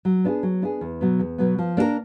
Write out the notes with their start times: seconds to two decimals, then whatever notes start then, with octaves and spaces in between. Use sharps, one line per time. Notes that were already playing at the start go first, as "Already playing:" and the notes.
0.05 F#3
0.24 B3 D4 F4 G#4
0.43 F#3
0.62 B3 D4 F4 G#4
0.81 E2
1.01 B2 F#3 B3
1.19 E2
1.38 B2 F#3 B3
1.58 F3
1.77 A#3 D4 G4 A#4